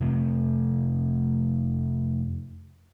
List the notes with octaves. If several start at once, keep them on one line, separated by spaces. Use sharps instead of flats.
F2 C3 A3